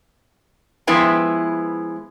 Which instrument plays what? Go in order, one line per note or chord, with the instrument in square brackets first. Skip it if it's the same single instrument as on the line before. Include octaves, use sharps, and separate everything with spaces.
[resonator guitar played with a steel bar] F3 G#3 B3 E4 B4 G5